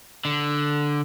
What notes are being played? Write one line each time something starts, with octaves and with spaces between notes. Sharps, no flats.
D3